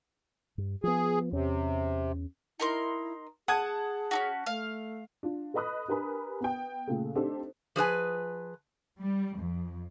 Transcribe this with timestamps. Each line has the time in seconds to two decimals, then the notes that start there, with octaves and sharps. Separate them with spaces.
0.58 G2
0.84 F3 B3 G#4
1.32 E2 C3 C#4
2.60 D#4 E4 A#4 C6
3.48 G#4 F#5 A5 D#6 G#6
4.11 C#4 D#4 F#4
4.46 A3 F5
5.23 D4 F4
5.54 A4 B4 D#5 B5 D#6 F#6
5.88 D4 G4 A#4 B4 G#5 B5
6.41 B3 G5
6.88 A#2 C#3 A3
7.15 C4 D4 D#4 G4 A4 C5
7.76 F3 G#4 B4 G#5
9.00 G3
9.38 F2